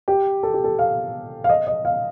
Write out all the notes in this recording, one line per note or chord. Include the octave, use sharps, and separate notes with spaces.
G4
A4
G4
A4
F5
F5
D#5
D#5
F5